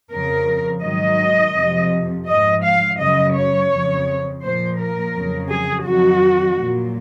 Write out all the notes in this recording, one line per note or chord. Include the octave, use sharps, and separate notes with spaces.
F2 C#3 F3 A#4
G#2 D#3 F#3 D#5
F2 C3 F3
G#2 F3 D#5
F5
F#2 C#3 F#3 D#5
C#5
F2 C#3 F3
A#2 F3 C5
A#4
F2 C#3 F#3
G#4
F2 D#3 F#3 F#4
A#2 F#3